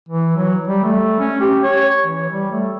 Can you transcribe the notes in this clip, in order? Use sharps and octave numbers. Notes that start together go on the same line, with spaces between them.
E3
F#3
G3
A3
C#4
G4
C#5
E3
G3
A3